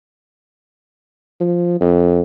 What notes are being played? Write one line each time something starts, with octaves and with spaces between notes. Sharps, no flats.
F3
F2